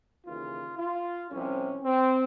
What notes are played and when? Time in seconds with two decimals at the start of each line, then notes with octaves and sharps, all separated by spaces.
0.25 D#2 C#3 E3 F4
0.78 F4
1.31 C2 C3 F3 C#4
1.84 C4